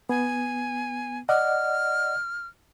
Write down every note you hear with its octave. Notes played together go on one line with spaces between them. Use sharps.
B3 G#5
D5 D#5 F#5 F6